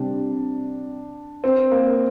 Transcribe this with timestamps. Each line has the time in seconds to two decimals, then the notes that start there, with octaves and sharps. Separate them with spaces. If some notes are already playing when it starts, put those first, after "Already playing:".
Already playing: C3 G3 C4 D4
1.44 C4
1.71 A#3